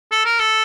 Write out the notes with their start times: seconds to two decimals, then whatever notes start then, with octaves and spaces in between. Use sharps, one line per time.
0.12 A4
0.25 A#4
0.39 A4